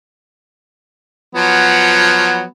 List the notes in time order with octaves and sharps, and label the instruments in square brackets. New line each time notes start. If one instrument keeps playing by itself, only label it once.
[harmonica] F3 F#3 B3